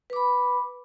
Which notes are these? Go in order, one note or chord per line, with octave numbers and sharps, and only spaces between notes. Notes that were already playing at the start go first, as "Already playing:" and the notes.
B4 B5 D6